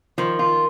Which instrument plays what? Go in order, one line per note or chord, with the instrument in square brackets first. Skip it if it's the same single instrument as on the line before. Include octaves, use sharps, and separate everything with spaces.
[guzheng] D#3 [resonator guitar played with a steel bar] F3
[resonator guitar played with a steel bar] F4